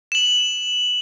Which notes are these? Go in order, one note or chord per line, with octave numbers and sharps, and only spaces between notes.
E7 F#7